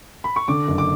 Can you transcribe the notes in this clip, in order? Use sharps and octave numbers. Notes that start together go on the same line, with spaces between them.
B5
C#6
D3 D6
F#1
D6